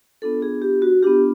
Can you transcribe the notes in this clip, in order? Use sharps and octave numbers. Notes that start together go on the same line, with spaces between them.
B3 D4 F4 A4
G#4
G4
F#4
B3 D4 F4 G4